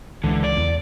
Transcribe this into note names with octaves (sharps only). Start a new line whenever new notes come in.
C#2 D3 E3
D5
E2